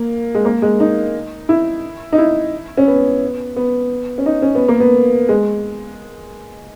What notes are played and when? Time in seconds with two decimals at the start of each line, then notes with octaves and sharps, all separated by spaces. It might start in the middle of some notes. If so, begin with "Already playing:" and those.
Already playing: A#3
0.35 G#3
0.45 A#3
0.62 G#3
0.80 D#4
1.49 E4
2.12 D#4
2.18 E4
2.77 C#4
2.88 B3
3.56 B3
4.18 C#4
4.26 D#4
4.42 C#4
4.55 B3
4.68 A#3
4.80 B3
5.29 G#3